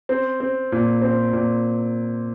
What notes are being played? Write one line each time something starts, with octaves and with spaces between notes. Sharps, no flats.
C4
C4
A#2
C4
A#2